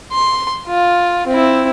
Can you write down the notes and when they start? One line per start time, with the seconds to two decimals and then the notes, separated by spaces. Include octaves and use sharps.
0.12 C6
0.67 F4
1.27 C4 E4